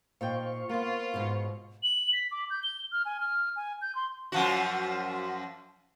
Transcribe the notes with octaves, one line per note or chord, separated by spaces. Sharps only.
A#2 D#4 C5 F5 G5 C#6
A#3 B3 F4
G#2 B2
F#7
B6
D6
G6
G7
F6
G#5
F6
G#5
G6
C6
F#2 F3 F#4